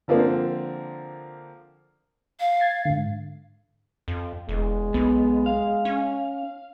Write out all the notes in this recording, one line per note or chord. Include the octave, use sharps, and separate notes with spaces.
D3 F3 A#3 C4 D4
F5
G#6 A6 C7
G#2 D3
F2
E1 G#3
B1 B3
F5
C#4